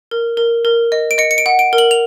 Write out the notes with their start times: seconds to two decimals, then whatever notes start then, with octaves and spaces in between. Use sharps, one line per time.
0.11 A#4
0.37 A#4
0.65 A#4
0.92 D#5
1.11 D7
1.18 D#5 C#7
1.31 C#7
1.38 D7
1.46 F#5
1.59 D7
1.73 A#4
1.78 F#7
1.91 F7